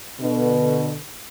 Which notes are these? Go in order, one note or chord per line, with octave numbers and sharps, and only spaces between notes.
B2 D3